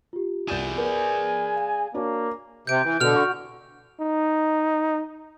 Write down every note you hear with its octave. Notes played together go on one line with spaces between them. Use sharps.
F4 G4
C2 G#4 D5 G6 E7
A#4 B4 G#5
F5
A#3 D4 F#4 C#5
C3 G6 D7
E3
B2 D3 F6 F7
F#4
D#4